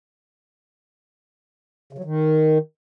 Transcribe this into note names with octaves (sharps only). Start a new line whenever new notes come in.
C#3
F#3
D#3